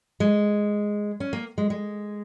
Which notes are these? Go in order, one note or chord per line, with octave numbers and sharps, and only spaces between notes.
G#3
C#4
A#3
G#3
G#3